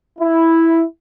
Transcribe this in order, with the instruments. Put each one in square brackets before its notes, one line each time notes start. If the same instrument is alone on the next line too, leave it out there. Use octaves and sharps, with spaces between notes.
[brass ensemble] E4